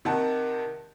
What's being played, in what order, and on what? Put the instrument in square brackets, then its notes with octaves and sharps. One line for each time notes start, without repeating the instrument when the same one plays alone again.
[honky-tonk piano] C3 D#3 D#4 F#5 A5